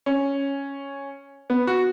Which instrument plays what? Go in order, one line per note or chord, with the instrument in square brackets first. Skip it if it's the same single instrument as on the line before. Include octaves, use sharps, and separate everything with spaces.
[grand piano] C#4
B3
F#4